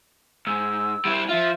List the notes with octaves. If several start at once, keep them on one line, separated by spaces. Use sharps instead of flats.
G#2 E6
G3 E4
F3 F4 E5